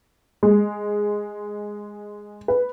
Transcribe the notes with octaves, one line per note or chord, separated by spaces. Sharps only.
G#3
B4